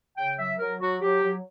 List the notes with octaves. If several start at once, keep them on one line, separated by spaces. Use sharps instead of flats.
C#3 G5
F#3 E5
F#3 A#4
F#3 F#4
F#3 G4
F#3